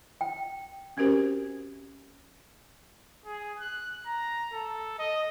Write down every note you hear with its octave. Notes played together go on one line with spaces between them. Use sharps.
G5
C4 C#4 F#4 G4 A#4 C5
G#4
F#6
A#5
A4
D#5